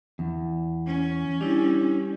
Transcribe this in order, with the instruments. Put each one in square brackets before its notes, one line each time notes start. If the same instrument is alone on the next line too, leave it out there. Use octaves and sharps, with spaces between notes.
[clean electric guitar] E2
[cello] C#4
[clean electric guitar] G3 [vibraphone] D4 E4